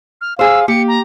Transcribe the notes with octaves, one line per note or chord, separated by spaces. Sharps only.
F6
G#4 C5 F5 E6
A#3 G4 C#7
A#5